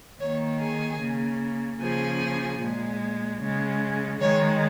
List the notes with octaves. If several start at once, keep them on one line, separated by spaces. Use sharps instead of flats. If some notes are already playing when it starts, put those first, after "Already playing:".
D#3 A#3 C#5
G#4
C#3 A#3
C#3 F3 A#3 G#4
A#2 G#3
C#3 G#3
D#3 G#3 C#5